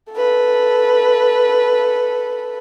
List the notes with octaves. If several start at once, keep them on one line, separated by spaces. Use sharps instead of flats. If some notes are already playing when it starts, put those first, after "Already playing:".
A4 B4